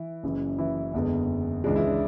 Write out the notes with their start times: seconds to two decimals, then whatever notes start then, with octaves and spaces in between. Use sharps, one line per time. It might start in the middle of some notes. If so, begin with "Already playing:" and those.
Already playing: E3 E4
0.23 F#1 F#2 C#3 E3
0.58 E3 E4
0.93 F#1 E2 D3 G#3 B3
1.64 C#2 C#3 E3 G#3 D4
1.75 E3 E4
1.87 D4